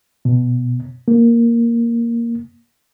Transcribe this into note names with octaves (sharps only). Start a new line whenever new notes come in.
B2
A#3